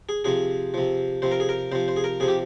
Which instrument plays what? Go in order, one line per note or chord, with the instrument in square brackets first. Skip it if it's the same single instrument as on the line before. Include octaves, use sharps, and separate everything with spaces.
[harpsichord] G#4
C3 F3 G#4
C3 F3
C3 F3 C5
A#4
G#4
A#4
C3 F3 C5
C5
G#4
A#4
C3 F3 G#4
G4